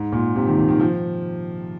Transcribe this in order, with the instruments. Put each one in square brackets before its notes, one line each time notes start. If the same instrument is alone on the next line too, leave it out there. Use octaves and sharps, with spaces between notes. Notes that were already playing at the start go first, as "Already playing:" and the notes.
Already playing: [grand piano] G#2
A#2
C3
D#3
D#3
D#3
F3